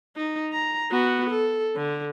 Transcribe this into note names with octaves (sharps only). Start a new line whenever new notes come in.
D#4
A#5
B3 F#4
A4
D3